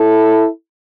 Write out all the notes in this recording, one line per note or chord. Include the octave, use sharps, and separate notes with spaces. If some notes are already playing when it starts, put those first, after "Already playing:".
Already playing: E4 A4